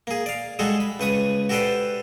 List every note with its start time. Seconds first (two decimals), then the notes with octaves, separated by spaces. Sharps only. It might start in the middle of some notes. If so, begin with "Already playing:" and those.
0.07 A#3 G#4
0.26 D5 F5
0.59 G3 G#3 F#4 G#4 A4
0.80 B5
1.00 C#2 B4 C#6 D#6
1.49 F#4 G4 A4 B4 C5 D5